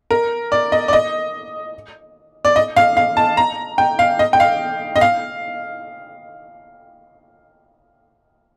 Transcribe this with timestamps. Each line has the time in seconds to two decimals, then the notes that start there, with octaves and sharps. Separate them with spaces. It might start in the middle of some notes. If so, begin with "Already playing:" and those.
0.11 A#4
0.52 D5
0.72 D#5
0.88 D5
0.93 D#5
2.45 D5
2.56 D#5
2.76 F5
2.97 F5
3.17 A5
3.37 A#5
3.78 G5
3.99 F5
4.19 D#5
4.33 G5
4.40 F5
4.96 D#5
5.01 F5